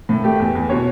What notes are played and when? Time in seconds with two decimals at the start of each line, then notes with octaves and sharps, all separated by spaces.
0.09 A2
0.24 A3 G4
0.40 E2
0.55 E2
0.69 B2 C#5